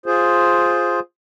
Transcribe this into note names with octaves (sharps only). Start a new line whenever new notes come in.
F4 G#4 C5